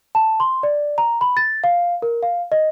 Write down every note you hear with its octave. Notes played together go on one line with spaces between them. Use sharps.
A5
C6
D5
A#5
B5
A6
F5
A#4
F5
D#5